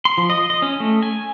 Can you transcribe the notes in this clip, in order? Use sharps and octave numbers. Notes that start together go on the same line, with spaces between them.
C6
F3
D#5
D#5
C#4
A3
G#5